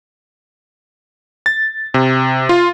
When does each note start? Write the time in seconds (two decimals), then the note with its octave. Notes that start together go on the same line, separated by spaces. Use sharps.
1.46 A6
1.94 C3
2.49 F4